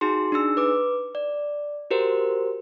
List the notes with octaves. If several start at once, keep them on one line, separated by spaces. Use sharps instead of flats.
D#4 F#4 G#4 C6
D4 D#4 G#4 E6
B4 D6
D5
F#4 G4 A#4 C5